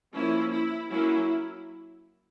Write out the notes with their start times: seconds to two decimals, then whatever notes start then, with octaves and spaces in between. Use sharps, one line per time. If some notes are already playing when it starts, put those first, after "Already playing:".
0.14 F3 A#3 C#4 E4
0.52 E4
0.91 F#3 A#3 C#4 E4